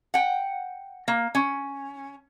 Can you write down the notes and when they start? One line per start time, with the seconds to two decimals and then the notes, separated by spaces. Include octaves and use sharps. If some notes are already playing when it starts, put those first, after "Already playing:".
0.14 F#5 G5
1.08 A#3
1.35 C#4